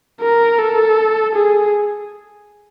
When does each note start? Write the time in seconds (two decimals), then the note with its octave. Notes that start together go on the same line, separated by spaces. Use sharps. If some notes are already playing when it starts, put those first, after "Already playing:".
0.21 A#4
0.59 A4
1.35 G#4